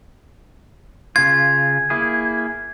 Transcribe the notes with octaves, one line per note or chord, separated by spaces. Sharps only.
C#3 F4 G#6
A#3 E4 G#4